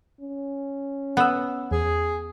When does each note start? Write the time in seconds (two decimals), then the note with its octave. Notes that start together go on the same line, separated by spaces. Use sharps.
0.21 C#4
1.17 B3 F#5 E6
1.71 E2 G#4